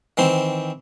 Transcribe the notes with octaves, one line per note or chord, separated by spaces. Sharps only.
D#3 E3 C4 C6